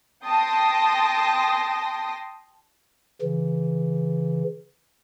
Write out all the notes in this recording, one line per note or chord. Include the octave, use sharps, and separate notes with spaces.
G5 A5 C6 D#6 A#6
C#3 E3